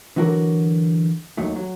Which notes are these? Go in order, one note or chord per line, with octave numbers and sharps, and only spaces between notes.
D3 E3 F#3 F#4 A4 A#4
D#2 D#3 F#3 A3
F#3